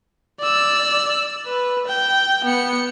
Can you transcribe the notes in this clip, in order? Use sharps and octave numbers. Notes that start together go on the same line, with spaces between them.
D5 E6
B4
G5
B3 C#7